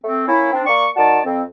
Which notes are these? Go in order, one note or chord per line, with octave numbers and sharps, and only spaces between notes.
A3 C4
A#3 C#4 E4
C4 D4
A#3 D5 C#6
D#3 F#4 D5 A5
F2 C4